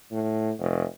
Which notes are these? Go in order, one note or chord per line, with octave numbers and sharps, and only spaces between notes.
A2
F1